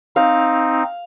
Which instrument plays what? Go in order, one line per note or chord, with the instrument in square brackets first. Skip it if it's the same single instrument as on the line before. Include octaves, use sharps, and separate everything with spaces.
[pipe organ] C4 D#4 [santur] F5